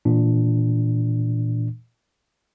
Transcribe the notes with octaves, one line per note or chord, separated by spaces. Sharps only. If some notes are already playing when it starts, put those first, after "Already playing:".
A#2 E3 D4